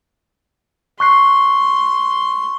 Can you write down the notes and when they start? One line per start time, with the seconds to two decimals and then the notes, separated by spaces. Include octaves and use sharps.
1.00 C6 C#6 F#6 C7